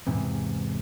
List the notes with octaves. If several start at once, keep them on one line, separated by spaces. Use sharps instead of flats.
E2 G#2 C3